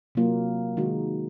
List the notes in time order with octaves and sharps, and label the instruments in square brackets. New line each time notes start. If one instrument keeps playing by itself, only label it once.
[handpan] C3 F#3 A#3 F4
D#3 G#3 D#4 F#4